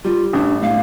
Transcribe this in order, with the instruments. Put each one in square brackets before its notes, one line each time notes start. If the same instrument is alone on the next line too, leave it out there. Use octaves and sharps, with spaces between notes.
[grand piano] G3 [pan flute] F4
[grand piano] A1 [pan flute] D4
[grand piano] A2 [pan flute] F5